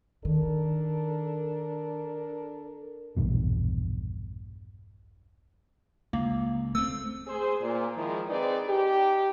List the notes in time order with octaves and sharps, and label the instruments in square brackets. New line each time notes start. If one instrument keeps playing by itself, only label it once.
[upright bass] D#3 [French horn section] D4 A4 A#4
[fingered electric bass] A#1 E2 G2 B2
[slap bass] C#2 [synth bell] A#3
[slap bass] A3 C4 [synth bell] E6
[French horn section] G#4 C5
A#2
D#3 F3 G#3 E4 A#4
C4 D#4 G#4 B4 D5
D#4 G4